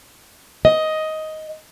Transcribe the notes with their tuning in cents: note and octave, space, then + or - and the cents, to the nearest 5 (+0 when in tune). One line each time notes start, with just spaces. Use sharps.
D#5 +10